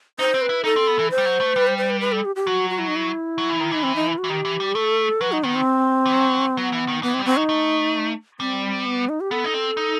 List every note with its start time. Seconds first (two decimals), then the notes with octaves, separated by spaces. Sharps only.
0.19 D#4 C5
0.34 C4
0.42 B4
0.49 E4
0.64 D#4 A4
0.76 C4
0.87 B3
0.99 E3
1.11 C5
1.18 G3
1.25 F#3
1.40 A3
1.56 G3 B4
1.67 C5
1.78 C5
1.90 B4
2.01 B4
2.12 A4
2.25 G4
2.36 G4
2.47 F#3 F#4
2.70 F#4
2.79 E4
2.88 D#4
2.96 E4
3.38 F#3
3.49 E3
3.60 D#3
3.71 E3 D#4
3.83 C4
3.96 D#4
4.07 E4
4.18 F#4
4.24 E3
4.30 D#3 G4
4.45 E3
4.60 G3
4.75 A3 A4
5.21 F#3 B4
5.32 D#4
5.44 D#3 B3
5.55 C4
6.06 E3
6.12 F#3
6.57 F#3 B3
6.73 E3
6.88 D#3
7.03 E3 B3
7.14 C4
7.19 G3
7.25 F#3 C4
7.37 D#4
7.49 A3
8.40 G3 C4
8.86 B3
9.09 D#4
9.20 G4
9.31 B3 A4
9.44 D#4
9.54 C4
9.77 D#4